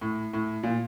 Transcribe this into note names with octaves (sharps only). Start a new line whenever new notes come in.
A2
A2
A#2